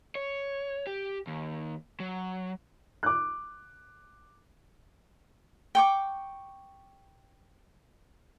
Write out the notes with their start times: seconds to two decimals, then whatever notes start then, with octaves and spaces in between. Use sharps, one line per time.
0.15 C#5
0.87 G4
1.27 D#2
2.00 F#3
3.03 D6 F#6
5.75 G5 C#6 D6